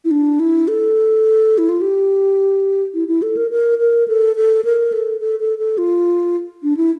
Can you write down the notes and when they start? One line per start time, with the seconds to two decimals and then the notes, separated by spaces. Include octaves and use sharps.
0.05 E4
0.11 D4
0.40 E4
0.68 A4
1.58 E4
1.69 F4
1.82 G4
2.94 E4
3.08 E4
3.22 A4
3.37 A#4
3.51 A#4
3.79 A#4
4.08 A4
4.36 A4
4.65 A#4
4.92 A4
5.20 A4
5.40 A4
5.58 A4
5.78 F4
6.63 D4
6.77 E4